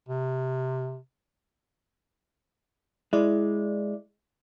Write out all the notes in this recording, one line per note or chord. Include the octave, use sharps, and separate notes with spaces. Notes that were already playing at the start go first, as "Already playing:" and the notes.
C3
G#3 E4 D5